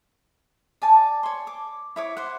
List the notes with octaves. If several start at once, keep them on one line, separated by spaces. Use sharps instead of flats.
D5 G#5 A5
C#5 C6
D6
E4 C#5 D6
C5 F#5